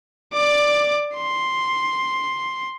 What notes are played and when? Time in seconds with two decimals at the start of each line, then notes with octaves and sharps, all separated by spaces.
0.34 D5 D6
1.15 C6